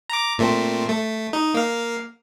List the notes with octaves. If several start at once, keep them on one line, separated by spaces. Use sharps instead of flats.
A#5 D6
A#2 A3 C4
A3
D#4
A#3 F5